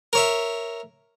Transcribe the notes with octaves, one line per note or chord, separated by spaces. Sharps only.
A#4 C#5 E5